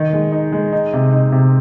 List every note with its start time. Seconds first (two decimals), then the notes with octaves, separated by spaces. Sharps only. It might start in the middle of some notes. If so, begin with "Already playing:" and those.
Already playing: D#3
0.13 G#3
0.32 D#4
0.52 G#3
0.73 D#4
0.93 C3
1.12 D#4
1.32 C3